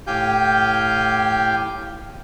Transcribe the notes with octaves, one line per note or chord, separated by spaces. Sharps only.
A2 G4 F5 G5 G#5 G6